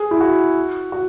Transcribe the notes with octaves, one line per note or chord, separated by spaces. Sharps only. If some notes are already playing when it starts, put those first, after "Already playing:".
Already playing: G#4
E4
F#4
F#4